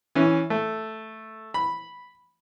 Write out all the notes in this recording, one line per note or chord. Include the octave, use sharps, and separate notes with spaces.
E3 C#4
A3
B5